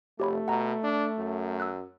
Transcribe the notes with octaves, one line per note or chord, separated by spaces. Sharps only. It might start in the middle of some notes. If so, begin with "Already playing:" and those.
F1 A3 G4 C#5 B5
B2 F#5 A#5
D4
F#2
E6 F#6